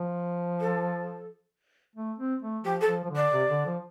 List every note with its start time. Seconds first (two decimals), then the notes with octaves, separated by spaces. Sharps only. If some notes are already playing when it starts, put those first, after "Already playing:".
Already playing: F3
0.60 A4
1.96 A3
2.19 C4
2.42 A3
2.64 F3 G4
2.81 A4
2.87 F3
3.04 F3
3.10 D3
3.15 D5
3.32 C3
3.50 D3
3.66 F3